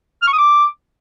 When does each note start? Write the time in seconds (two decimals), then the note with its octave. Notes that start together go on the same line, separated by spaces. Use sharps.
0.22 F6
0.28 C#6
0.33 D#6
0.38 D6